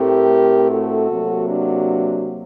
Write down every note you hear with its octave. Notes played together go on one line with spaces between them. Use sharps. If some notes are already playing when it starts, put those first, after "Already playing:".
Already playing: A2 A3 C4 G4 A#4
F#4 A4
C3 F#3 A#3
D4 F#4